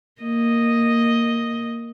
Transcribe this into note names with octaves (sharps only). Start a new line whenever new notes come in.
A#3 D#5